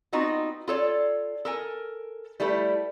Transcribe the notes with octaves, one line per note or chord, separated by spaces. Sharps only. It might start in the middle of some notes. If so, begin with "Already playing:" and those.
B3 C4 D#4 F4 F#4
F4 A4 C#5 D5
A4 A#4 G#5
G3 A3 E4 A4 B4